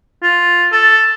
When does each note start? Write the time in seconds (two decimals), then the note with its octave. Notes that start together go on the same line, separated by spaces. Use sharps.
0.23 F4
0.72 A4